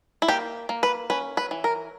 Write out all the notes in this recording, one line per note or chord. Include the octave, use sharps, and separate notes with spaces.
E4
A#3 G4
A#3
B4
C#4 B4
B4
E3
A#4